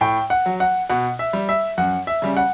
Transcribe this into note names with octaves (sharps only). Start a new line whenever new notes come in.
A2 G5
F#5
F#3
F#5
B2 F#5
E5
G3
E5
F#2 F#5
E5
C#3 G3
F#5